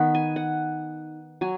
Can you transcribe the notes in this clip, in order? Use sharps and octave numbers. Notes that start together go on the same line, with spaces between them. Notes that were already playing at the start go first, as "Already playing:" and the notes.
Already playing: D#3 B3 D#4 F#5 B5
G#5
F#5
F#3 G#5